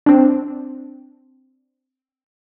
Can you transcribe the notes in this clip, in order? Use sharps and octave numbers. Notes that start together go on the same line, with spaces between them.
C4 D4